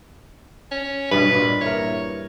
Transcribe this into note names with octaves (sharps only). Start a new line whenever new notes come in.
C#4
G2 B2 B4
A#2
E3 A#4 C#5